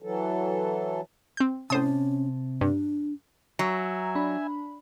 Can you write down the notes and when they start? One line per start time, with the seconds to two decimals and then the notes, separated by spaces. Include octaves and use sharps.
0.02 E3 F#3 A4
1.37 C4 G6
1.70 A2 C3 C#4 C5 A5 D#6
2.61 G2 D4
3.59 F#3 E5 G#5 A#5
4.15 D4 B5